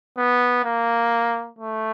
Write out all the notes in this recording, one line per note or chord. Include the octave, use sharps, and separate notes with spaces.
B3
A#3
A3